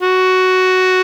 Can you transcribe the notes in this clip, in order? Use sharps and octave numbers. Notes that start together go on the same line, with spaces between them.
F#4